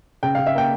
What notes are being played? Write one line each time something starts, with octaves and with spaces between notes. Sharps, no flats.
C#3 G5
C#3 F5
E5
A#3 G5